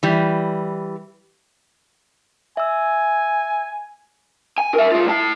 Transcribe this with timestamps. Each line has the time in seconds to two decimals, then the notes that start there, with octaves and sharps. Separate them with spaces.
0.03 E3 G3
2.57 E5 G#5 E6
4.58 G#5
4.74 A#4 E5
4.92 G#3 F4
5.08 E4 A5